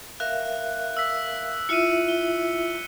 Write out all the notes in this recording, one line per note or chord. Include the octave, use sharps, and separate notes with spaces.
A#4 E5 F5 F#6
E6 B6
E4 F4 E5 C#7 D#7
G7